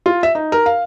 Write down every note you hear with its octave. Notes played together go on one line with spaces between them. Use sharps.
F4
E5
D#4
A#4
F5